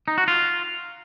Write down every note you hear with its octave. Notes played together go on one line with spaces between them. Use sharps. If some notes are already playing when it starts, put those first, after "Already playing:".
D#4
F#4
F4